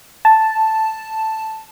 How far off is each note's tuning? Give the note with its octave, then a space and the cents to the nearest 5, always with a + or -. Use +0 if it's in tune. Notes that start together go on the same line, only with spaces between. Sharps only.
A5 +0